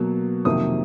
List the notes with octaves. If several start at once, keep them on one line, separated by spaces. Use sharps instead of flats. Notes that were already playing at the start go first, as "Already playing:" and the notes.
Already playing: B2 F#3 A#3
F2 C3 D#3 F#3 A#3 D#6